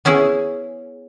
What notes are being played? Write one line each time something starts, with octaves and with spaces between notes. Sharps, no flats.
B3 C#4 E4 G#4